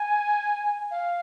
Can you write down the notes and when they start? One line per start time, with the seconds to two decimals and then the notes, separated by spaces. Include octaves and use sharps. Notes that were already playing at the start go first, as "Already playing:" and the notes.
Already playing: G#5
0.91 F5